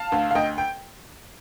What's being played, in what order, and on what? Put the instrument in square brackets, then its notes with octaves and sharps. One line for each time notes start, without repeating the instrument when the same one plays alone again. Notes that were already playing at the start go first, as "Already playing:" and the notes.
Already playing: [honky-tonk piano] F5 A5
D2
F5
D2 D#5 G5
G5